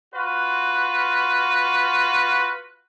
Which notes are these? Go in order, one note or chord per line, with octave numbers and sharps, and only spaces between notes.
F4 F#4 B4